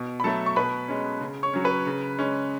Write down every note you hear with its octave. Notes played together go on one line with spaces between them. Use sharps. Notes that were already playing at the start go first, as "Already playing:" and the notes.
Already playing: B2
B5
F#3 A3 A4 A5
C#6
B2 B4 B5
G#3 C#4
C#3
C#5 C#6
F#3 C#4
B4 B5
C#3
G#3 C#4